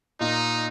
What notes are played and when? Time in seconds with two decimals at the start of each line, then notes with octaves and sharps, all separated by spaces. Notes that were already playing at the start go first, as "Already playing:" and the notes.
0.21 A#2 D#4